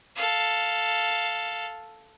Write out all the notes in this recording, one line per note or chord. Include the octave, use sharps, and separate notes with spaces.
A4 F5